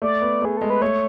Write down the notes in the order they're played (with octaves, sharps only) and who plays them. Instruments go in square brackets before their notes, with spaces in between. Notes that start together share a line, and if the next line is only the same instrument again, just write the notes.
[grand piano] A3 [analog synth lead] D5
[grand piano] B3
[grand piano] A3 [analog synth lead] G#4
[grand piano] G#3 [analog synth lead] A4
[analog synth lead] B4
[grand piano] A3 [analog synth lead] C#5